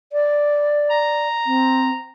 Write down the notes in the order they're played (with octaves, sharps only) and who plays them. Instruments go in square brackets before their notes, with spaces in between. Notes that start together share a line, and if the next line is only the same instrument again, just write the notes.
[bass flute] D5
[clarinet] A#5
[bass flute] C4